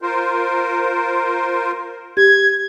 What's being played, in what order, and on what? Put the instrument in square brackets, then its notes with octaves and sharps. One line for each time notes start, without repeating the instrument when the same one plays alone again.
[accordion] F4 A#4 C5
[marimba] G4 [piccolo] G#6